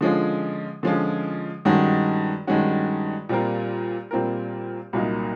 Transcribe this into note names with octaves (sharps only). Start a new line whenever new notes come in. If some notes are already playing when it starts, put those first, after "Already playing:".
D3 F3 G#3 C#4 F4
D3 F3 G#3 C#4 F4
G2 D#3 G#3 C#4 F#4
G2 D#3 G#3 C#4 F#4
A#2 G3 C4 F4 A#4
A#2 G3 C4 F4 A#4
C2 A#2 F#3 A#3 D#4